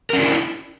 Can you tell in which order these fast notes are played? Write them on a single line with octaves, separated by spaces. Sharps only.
A#4 C#4 D4 F#4 E4